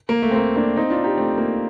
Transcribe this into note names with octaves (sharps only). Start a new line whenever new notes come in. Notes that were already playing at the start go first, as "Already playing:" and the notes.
A#3
A3
C4
A#3
A#3 D4
C4 D#4
D4 F4
D#4 G4
A3 C4
A#3